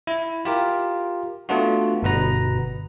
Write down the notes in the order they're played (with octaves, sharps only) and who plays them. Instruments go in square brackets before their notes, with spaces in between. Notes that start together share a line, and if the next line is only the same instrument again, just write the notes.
[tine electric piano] E4
F4 G4 A#4
A3 B3 D4 F4 F#4
G1 B2 B3 B4 A#5